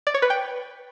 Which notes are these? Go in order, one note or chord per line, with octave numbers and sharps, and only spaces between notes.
D5
C#5
B4
G5